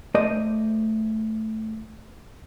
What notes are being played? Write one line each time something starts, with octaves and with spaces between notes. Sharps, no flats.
A3 C5 D5 D#5